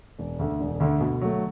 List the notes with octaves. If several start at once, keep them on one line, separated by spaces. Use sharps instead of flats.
E1
D2 D3
E1
D2 D3
B2
F#3 A3